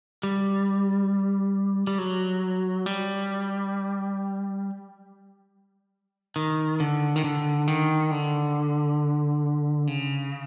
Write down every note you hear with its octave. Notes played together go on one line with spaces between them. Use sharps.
G3
G3
F#3
G3
D#3
D3
D#3
D3
D#3
D3
C#3